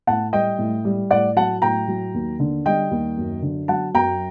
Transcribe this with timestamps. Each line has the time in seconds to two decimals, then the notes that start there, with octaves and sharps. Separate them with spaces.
0.07 A2 F#5 A5
0.33 G3 D#5 G5
0.58 A2
0.85 G3
1.11 A2 D5 F#5
1.36 F#3 F#5 A5
1.62 A2 G5 A#5
1.88 F#3
2.14 D#2
2.40 D3
2.66 G3 D#5 G5
2.91 D#2
3.17 F#2
3.42 D3
3.68 F#3 F#5 A5
3.95 F#2 G5 A#5